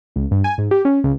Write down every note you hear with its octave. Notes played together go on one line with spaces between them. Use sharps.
C#2
G2
G#5
G#2
G4
C#4
C#2